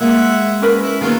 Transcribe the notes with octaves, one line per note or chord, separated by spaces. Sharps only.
G#3 A#3 E5 F#5
C#4 A#4 B4
E4
D#3 F#3 G#3 A#3 B3 F4